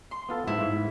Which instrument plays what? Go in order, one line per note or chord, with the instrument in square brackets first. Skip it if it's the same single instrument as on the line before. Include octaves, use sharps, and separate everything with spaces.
[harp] C6
[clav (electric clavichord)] B3 F4 A4
[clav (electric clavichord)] G#2 [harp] E4
[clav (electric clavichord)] G#2